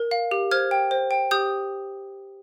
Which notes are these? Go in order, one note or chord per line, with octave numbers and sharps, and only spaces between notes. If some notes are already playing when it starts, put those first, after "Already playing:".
Already playing: A#4
F5
G4
C5 F6 G#6
G5
C5
G5
G4 D#6 G6